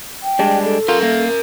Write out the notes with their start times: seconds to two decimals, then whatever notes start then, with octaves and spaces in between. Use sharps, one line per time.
0.23 G5
0.39 G3 G#3 D4
0.65 A4
0.88 F4 A#4 E5
1.03 A#3